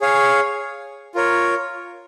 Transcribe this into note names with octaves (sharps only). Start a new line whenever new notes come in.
G#4 C#5 F5
F4 A#4 C#5